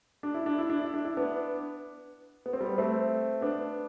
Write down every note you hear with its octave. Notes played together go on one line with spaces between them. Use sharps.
D4
E4
D4
E4
D4
E4
D4
E4
B3 D4
B3
C4
G3 B3
A3 C4
B3 D4